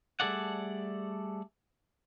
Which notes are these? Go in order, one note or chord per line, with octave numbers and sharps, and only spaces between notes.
G3 A3 G#4 A4 D5 F#5